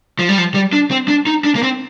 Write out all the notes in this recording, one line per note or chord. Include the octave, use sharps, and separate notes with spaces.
F3
G3
F3
G3
D4
C4
D4
D#4
D4
A#3
C4